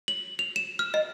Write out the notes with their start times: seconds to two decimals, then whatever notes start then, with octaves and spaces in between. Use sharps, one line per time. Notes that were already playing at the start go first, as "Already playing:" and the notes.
0.08 F#7
0.39 F7
0.56 E7
0.79 F6
0.94 D#5